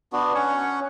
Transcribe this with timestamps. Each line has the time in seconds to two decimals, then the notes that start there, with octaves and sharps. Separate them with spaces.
0.13 B3 D4 F#4
0.35 C#4 C#5 F#5